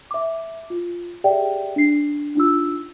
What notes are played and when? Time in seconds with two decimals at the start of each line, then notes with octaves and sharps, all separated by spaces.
0.11 E5 D6
0.70 F4
1.24 G4 G#4 D5 E5 G5
1.76 D4 D#4 C7
2.35 D4 D#4 F4 E6